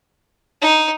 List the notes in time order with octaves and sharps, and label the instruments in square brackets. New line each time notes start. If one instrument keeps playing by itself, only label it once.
[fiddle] D#4